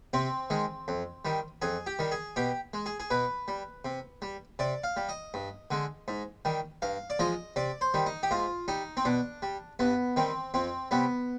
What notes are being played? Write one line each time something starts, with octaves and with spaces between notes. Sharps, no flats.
C3 C4
D#3 G#3
F2
D#3 G3
F2 G#4
G4
D#3 G3
G#4
B2 G4
G#3
G#4
G#4
B2 B4
G3
C3
G3
C3 D5
F5
G3
D#5
G2
D3 G#3
G#2
D#3 G3
G2 F5
D5
F3 G#3 D#5
C3 D5
C5
D#3 G3
D#4
G4
G#2 F4
G3 D#4
C4
B2 D4
G3
G2 B3
D#3 G3 C4
F2 C4
C3 G3 B3